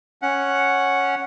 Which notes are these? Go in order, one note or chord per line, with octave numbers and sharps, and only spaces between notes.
C#4 F#5